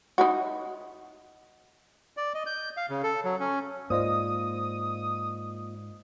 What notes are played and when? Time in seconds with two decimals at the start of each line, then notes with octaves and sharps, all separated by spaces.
0.18 D#4 E4 F#4
2.17 D5
2.34 D#5
2.46 G6
2.77 F5
2.90 C#3
3.03 A4
3.24 F#3
3.40 C#4
3.90 G#2 A#3 F4 C5 D5 D#5 D#6